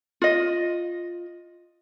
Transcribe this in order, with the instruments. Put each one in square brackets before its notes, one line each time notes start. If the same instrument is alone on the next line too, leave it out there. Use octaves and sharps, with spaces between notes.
[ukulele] F4 D#5